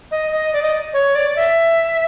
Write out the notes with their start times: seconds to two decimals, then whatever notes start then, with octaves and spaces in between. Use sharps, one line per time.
0.11 D#5
0.32 D#5
0.53 D5
0.62 D#5
0.94 C#5
1.15 D5
1.36 E5